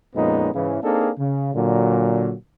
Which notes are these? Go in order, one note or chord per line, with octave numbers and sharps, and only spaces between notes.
F2 A#2 G#3 B3 C#4 D#4
G#2 C#3 E3
A#3 C4 D4 D#4 G#4 A4
C#3
A#2 D3 F#3